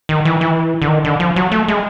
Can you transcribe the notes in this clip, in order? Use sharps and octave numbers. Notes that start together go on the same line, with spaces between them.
D#3
E3
E3
D3
D#3
D3
F3
F#3
A3
G#3